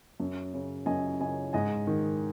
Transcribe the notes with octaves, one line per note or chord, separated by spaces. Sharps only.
F#2
C#3
F#2 D#5 G#5
C#3 D#5 G#5
G#2 D#5 G#5
D#3